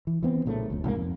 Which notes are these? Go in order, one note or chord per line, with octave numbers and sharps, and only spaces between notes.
E3
E3 B3 C4
B1 A#2 C#3 A3
F#1 D2
C2 G#2 F#3 A#3
F2